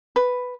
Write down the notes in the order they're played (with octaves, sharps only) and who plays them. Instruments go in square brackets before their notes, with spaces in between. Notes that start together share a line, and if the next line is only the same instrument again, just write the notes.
[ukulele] B4